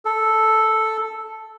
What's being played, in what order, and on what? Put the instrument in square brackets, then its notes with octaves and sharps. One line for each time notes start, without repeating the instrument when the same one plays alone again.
[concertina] A4